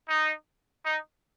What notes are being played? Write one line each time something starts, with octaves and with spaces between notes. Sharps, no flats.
D#4
D#4